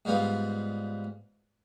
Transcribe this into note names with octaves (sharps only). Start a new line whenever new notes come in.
G#2 G3 B3 F4